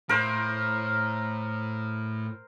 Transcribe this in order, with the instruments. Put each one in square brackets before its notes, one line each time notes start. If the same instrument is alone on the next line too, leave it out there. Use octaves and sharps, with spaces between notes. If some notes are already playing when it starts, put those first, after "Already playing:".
[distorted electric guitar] A2 [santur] A#4 C5